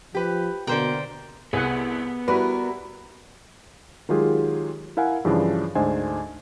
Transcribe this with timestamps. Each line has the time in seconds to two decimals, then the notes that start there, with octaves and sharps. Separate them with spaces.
0.15 F3 G4 B4
0.67 B2 D3 A#3 A#4 C5 G5
1.53 C2 B3 G#4 F#5
2.28 G3 E4 F#4 A#4 B4
4.09 D#3 F#3 G#3 F4 G4 G#4
4.97 E4 A#4 F5 F#5 G#5
5.25 G2 C#3 E3 F3 D4
5.75 D2 G#2 D4 C5 D#5 G#5